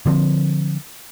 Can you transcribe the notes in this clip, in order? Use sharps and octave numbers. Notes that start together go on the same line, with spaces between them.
D3 F3 C4